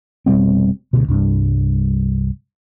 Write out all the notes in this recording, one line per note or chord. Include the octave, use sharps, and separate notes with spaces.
F1 B2 G3 C4
D2 B2
C2 G2 D4